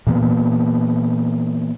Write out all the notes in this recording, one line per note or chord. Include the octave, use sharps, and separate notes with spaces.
A#2 E3 A#3 B3